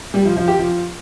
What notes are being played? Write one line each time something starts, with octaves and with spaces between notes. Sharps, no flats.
G3
F3
F3
G4
F3